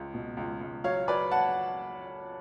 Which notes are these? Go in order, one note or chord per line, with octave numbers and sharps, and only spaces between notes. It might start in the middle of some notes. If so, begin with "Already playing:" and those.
Already playing: C#2
B2
C#2
C#2
F#3 C#5 F5
F#3 B4 D5
F#5 A5